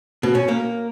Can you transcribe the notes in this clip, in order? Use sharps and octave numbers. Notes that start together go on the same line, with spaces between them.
B2
C#4
A#3